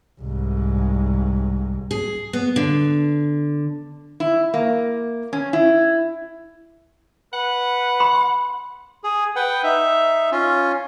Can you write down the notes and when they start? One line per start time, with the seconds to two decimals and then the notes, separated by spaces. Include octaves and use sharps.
0.21 C2 G#2
1.91 G#4
2.33 B3
2.56 D3
4.20 E4
4.54 A#3
5.33 C#4
5.53 E4
7.33 B4 F#5
8.00 B5 C6
9.04 G#4
9.36 B4 F#5 G5
9.63 D#4 E5
10.32 C#4 F4